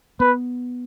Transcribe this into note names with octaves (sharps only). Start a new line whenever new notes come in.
B3 B4